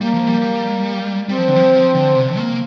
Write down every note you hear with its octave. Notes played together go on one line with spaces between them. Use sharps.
G3 A#3
F3
G3
G3 C4
F3
D3
F3
D3
C3
A#3